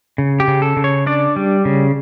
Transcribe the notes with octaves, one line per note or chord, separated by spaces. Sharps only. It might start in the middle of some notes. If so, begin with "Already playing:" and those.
C#3
G4
C#3
A4
C#3
C#5
D4 D5
G3
C#3